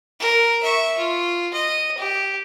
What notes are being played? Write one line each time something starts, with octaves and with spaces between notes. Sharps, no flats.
A#4
E5 C#6
F4
D#5
G4